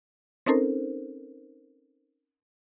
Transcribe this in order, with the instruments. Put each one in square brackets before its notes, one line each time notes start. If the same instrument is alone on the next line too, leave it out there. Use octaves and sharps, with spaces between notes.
[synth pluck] C4 C#4 D#4 A4 A#4 C5